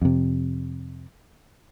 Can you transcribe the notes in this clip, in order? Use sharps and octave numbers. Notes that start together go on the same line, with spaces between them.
F2 C3